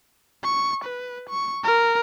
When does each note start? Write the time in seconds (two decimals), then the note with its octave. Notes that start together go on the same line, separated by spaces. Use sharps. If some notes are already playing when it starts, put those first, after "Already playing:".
0.45 C#6
0.85 B4
1.30 C#6
1.64 A#4